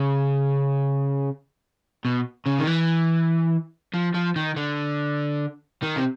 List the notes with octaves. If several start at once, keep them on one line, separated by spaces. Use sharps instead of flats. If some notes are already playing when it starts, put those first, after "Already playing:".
Already playing: C#3
B2
C#3
D#3
E3
F3
F3
D#3
D3
D#3
C3